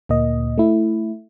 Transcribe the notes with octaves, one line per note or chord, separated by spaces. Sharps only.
D2 A#2 A#3 D#5
A3 E4